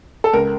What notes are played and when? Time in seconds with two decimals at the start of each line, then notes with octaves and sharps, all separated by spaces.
0.24 A4
0.33 C#2 A#4